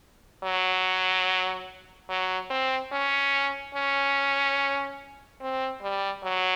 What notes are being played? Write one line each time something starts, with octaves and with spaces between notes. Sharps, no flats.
F#3
F#3
C4
C#4
C#4
C4
G3
F#3